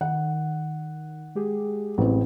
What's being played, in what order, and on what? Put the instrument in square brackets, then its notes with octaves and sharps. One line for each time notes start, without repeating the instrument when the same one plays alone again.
[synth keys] D#3 [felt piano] F#5
[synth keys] G#3 G4 G#4
[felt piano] A1 C4